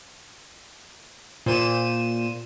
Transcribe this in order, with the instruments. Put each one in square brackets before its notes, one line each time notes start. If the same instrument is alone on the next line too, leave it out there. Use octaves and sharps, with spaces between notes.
[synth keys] A#2 C5 D#7 E7